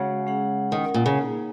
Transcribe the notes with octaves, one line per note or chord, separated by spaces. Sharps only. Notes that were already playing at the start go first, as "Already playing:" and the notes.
Already playing: C#3 G#3 F#4 C#5 F#5
G#3 C#4 G#4 F#5
D#3 C#4 A#4 F#5
A#2
C#3
A#3 D#4 G#4